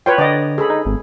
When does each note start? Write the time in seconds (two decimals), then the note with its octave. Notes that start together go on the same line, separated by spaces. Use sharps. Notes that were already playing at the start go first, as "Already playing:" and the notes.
0.06 F4 B4 C#5 G5
0.18 D3 D5 D#5
0.58 G#4 A4 B5
0.70 D#4
0.85 G#1